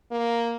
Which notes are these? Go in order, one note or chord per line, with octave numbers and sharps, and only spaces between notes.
A#3